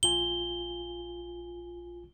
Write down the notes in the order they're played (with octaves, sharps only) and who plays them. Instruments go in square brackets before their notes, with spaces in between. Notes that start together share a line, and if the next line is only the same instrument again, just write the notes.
[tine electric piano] A#1 F4 G#5 [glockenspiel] G7